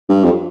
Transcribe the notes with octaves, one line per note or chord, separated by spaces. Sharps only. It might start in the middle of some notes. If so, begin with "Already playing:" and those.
G2
F2